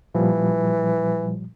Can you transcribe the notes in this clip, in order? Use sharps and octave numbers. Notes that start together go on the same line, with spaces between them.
A#2 E3 F3 G3